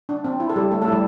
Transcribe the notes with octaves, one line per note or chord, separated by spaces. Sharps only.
D4
C4
E4
A4
G3 G4
A3 A4
A3 A4
E4
G3 G4